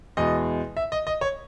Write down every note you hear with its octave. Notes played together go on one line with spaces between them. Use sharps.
E2 B2 G#3 D#5
E5
D#5
D#5
C#5